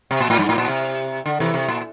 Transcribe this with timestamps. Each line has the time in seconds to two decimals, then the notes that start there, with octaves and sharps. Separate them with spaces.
0.11 C3
0.20 A#2
0.30 A2
0.39 G2
0.49 A2
0.58 A#2
0.68 C3
1.26 D3
1.40 C3 E3
1.54 C3
1.68 A#2